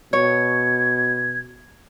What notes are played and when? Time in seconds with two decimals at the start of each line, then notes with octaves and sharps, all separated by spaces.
0.13 B2 C#5 G#6